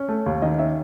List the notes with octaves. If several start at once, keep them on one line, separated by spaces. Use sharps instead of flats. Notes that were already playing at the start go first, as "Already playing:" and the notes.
Already playing: C#4
A3
D#2
D#3 D#5
C#4 E5